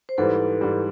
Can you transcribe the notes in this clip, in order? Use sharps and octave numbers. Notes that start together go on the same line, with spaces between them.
C5
G#2 E3 G3 A4 B4
G#2 E3 G3